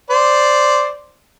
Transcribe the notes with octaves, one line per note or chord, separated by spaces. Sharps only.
C5 D5